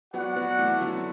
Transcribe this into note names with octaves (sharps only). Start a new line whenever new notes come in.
F#3 B3 F#4 D5 F#5
F#3 B3
E3 A3
D3 F#3
D3